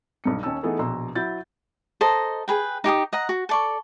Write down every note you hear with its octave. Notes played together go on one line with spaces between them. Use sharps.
B1 G2 C#7
D#2 C#4 D#4 A5 E6
E3 A3 B3 D#4 G#4 A4
A#1 B2 A#5 C6 E6
F#3 E4 G6 A6
A4 C5 D#5 A#5
G#4 B4 G5
D#4 G4 G#5 D#6
D#5 F#5 A#5
F#4
A4 D5 C#6